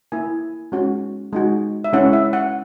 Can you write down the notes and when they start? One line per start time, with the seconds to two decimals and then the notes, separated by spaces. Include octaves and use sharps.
0.12 A#3 E4 G#5
0.72 G#3 C#4 F#4
1.33 G#3 D#4 F#4
1.84 E5
1.93 G#3 C#4 E4 F#5
2.13 E5
2.33 F#5